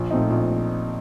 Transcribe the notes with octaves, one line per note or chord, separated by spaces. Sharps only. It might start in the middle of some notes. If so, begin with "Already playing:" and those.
Already playing: A#1
A#2 A3 C4 D#4
A#1